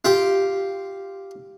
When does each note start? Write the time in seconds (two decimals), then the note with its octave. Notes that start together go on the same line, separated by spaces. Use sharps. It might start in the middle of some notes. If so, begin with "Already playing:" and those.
0.05 F4 G4